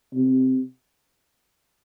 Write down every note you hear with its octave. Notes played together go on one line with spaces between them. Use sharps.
C3